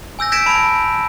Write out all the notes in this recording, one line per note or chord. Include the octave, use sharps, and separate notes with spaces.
G#5 E6 G6 A#6
G6 G#6 A#6 B6 D7 E7
A5 B5 D7